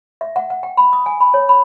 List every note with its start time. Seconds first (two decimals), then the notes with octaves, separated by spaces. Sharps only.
0.21 E5
0.36 F#5
0.50 F#5
0.63 G5
0.77 B5
0.93 D#6
1.06 G#5
1.20 B5
1.34 C#5
1.49 B5